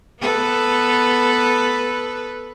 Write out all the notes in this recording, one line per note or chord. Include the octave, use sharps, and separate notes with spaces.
B3 A4 B4